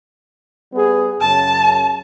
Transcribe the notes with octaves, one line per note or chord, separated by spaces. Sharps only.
G3 B3 G#4
F#2 C#3 A5